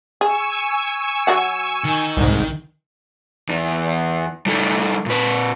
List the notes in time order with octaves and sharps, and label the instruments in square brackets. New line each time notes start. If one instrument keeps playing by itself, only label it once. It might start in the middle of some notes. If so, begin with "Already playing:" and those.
[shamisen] G#4 [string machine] G#5 C#6 E6
[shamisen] F#3 F#4 F#5
[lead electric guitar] D#3
[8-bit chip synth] C2 G#2
[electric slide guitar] E2 E3
G3 E4 A4
A#2 B4